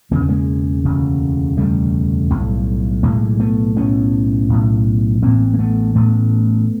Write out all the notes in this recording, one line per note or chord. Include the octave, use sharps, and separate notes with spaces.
E1 D2 C#3 A#3
B3
G#3 A#3
E1 D2 C#3
E1 D2 C#3 G3 A3
B1 A2
B1 A2 G#3 A#3
A3 B3
B1 A2 B3 C#4
B1 A2
A1 A2 A#3 C4
A#3
A3 B3
A1 A2 A3 B3